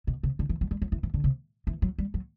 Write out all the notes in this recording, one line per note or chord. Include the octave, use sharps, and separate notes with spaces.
B2
C3
D3
E3
F#3
G3
F#3
E3
E3
D3
C3
E3
F#3
G3
F#3